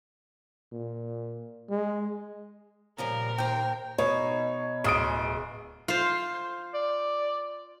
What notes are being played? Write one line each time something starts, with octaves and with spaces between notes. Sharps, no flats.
A#2
G#3
A#2 C#3 F3 G3 A#4
D#2 C5 G5
B2 D#4 C#5
D1 F3 G#4 D#6 D7
F4 C5
D5